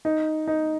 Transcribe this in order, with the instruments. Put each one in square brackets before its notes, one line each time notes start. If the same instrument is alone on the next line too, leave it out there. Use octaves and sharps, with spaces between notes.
[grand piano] D#4
D#4